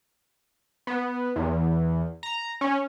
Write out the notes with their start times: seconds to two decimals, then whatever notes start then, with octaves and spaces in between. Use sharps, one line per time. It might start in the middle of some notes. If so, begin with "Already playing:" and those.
0.87 B3
1.36 E2
2.23 A#5
2.61 C#4